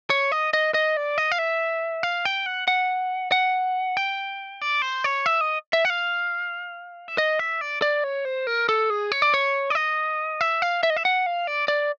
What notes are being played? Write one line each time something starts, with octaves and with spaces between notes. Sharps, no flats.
C#5
D#5
D#5
D#5
D5
D#5
F5
E5
F5
G5
F#5
F#5
F#5
G5
D5
C5
C#5
E5
D#5
E5
F#5
F5
E5
D#5
E5
D5
D5
C#5
C5
A#4
A4
G#4
C#5
D5
C#5
D5
D#5
E5
F5
E5
D#5
E5
F#5
F5
D5
D5